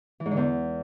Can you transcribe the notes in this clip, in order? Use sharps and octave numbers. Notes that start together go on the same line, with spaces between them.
E3
G#2
D3
E2